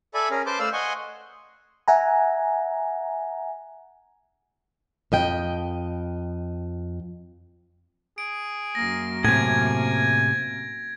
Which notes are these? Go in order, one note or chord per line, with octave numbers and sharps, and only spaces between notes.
A4 D5 E5 G#5 B5
C#4 G#4 A#4
B4 C5 A5 C6 D6
A3 C5 D5 F5 E6
D#5 F#5 G#5 C6 C#6
E5 F#5 G#5 A#5
F2 D#5 G5
G#4 D7
F#2 A#3 A#6
A2 C3 G#5 G#6